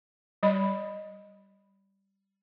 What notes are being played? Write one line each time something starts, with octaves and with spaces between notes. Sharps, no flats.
G3 D#5 B5